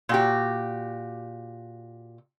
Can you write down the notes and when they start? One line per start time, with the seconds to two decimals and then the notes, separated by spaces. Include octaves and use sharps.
0.09 A#2 F#4 G4